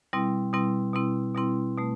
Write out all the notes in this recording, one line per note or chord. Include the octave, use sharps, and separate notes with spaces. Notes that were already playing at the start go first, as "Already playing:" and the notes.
B2 G3 C4 E4
B2 G3 C4 E4
B2 G3 C4 E4
B2 G3 C4 E4
B2 A3